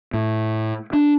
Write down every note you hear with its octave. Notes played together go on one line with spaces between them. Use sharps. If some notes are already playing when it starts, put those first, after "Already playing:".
A2
D4